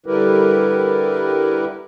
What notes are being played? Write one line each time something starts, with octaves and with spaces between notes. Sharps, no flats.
D3 G3 E4 G4 A#4 B4